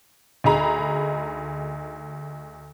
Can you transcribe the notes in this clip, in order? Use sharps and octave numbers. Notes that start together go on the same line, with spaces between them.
D2 D#4 G#4 A#5 B5